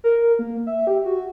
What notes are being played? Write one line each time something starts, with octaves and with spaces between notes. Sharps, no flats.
A#4
A#3
E5
G4
F#4